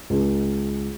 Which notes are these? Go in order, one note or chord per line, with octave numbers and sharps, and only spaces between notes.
C#2